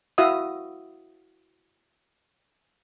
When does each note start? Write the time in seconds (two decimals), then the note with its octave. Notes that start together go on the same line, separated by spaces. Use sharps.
0.18 E4 F#4 E5 F5 D#6